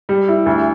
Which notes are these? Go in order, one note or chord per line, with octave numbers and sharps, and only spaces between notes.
G3
E4
D2